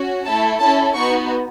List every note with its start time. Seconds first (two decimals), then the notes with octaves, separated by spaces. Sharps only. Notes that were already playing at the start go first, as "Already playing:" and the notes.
Already playing: C#4 F#4
0.25 A3 E4 A4 A5
0.60 C#4 E4 A4 A5
0.95 B3 D#4 F#4 C#6